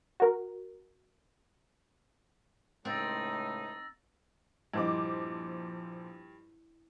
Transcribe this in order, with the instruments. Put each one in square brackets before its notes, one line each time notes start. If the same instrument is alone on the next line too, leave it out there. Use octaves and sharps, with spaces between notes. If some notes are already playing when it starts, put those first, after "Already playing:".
[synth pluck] F#4 A#4
[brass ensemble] C#2 A2 [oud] C4 [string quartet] D#4 [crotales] E6 A6 A#6
[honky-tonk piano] A#1 C5 D6 [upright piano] G2 [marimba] E4 D#5